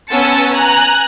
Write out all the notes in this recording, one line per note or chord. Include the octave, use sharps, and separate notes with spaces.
B3 C#4 A5 E6 C#7
G#5 A#5 F#6